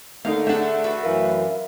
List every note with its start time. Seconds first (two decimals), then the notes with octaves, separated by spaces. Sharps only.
0.25 D3 A3 A#3 D#4 F5
0.47 A3 D4 G#4 E5 F#5 A5
0.84 F#4 B4 E5
1.03 F#2 E3 A#4 F5